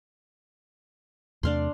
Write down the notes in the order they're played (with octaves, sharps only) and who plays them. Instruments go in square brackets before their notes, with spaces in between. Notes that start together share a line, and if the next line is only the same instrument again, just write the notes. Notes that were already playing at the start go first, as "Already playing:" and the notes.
[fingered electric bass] E2 C3 A3 [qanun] D4 F5 C6